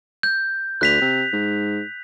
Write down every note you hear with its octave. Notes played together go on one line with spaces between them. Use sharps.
G6
D2 F#6 B6 F7
C3
G#2